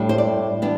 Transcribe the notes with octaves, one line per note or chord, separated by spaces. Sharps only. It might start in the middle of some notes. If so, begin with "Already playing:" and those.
Already playing: A2 G3 D4
C5
D5
E3 G3 B3 D4